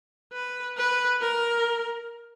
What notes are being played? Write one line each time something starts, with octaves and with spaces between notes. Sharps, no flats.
B4
B4
A#4